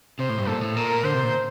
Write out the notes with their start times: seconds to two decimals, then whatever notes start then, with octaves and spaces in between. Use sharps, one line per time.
0.19 C3 C5
0.29 A2
0.39 G2
0.47 A#2 A4
0.62 A2
0.76 A#2 A#4
1.04 D3 C5
1.14 C3
1.23 A#2